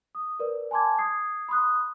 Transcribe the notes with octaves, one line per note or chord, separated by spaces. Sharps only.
D#6
A#4 B4 D5
G#5 A5 C6 D6 G#6
D#6 G#6 C7
B5 C6 D#6 F#6